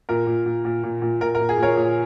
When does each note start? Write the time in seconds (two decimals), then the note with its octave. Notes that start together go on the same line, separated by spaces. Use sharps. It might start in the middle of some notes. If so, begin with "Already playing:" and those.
0.09 A#2 A#4
0.27 A#2
0.46 A#2
0.65 A#2
0.84 A#2
1.02 A#2
1.21 A#2 A#4
1.35 A#4
1.40 A#2
1.49 G#4
1.57 A#2
1.63 A#4 C#5
1.76 A#2